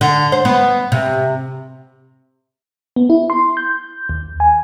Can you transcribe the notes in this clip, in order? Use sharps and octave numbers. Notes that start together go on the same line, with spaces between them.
D3
C5
B3
C3
B3
E4
C6
G6
D#2
G#5